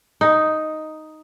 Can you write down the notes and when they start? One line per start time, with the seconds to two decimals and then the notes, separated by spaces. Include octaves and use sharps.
0.21 D#4